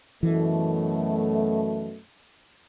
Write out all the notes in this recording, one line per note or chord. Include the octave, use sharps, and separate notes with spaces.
F#2 B2 E3 A3